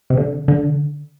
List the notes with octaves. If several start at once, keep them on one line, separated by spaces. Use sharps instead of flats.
C3
D3
D3